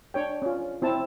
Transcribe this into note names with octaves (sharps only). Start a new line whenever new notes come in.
D4 C#5 G5
C#4 F4
C4 E4 A5